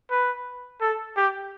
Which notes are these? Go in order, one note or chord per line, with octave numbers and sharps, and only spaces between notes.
B4
A4
G4